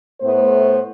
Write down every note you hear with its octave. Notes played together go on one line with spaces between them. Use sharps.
A2 A3 B3 C5